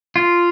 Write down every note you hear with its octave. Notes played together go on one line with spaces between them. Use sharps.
F4